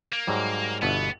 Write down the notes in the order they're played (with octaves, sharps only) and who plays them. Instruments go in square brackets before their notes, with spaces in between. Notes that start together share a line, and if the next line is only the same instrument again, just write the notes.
[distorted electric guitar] A#3
[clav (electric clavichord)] G#2 F#3 G3
[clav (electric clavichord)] G1 B2 E4 [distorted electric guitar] B3